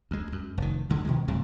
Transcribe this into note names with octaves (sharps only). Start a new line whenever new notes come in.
D2 G#3
F#2
F1 D#3
D2 D3 G#3
B2 D#3 F3 G#3
G2 C3 G3 A3